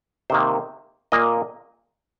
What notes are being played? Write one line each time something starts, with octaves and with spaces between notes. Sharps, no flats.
C3 D#3 A#3 C5
A#2 A#3 D#5